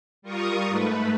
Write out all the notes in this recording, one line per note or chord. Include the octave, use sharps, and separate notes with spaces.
G3 F4 A#4 C#6 D#6
G#2 A3 B4